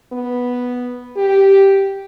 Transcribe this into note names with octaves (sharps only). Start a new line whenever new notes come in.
B3
G4